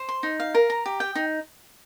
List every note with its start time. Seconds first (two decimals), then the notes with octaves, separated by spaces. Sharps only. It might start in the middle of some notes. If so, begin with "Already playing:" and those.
Already playing: C5
0.09 C6
0.23 D#4
0.40 F5
0.55 A#4
0.70 A#5
0.86 G4
1.00 G5
1.15 D#4